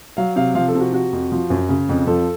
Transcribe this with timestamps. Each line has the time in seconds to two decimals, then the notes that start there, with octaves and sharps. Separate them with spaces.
0.17 F#3 F5
0.36 C3 F5
0.55 F3 F5
0.68 A4
0.75 C3
0.80 F#4
0.93 C3 F#4
1.12 F2
1.32 F3
1.50 F#2
1.69 C#3
1.89 F2
2.07 F3 A4